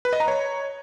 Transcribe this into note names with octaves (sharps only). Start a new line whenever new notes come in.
B4
D#5
A#5
C#5